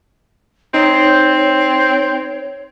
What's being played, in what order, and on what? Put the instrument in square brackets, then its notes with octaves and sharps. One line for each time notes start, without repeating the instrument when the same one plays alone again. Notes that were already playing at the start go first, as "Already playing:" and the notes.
[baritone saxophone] C4 [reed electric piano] D#4 [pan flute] C#5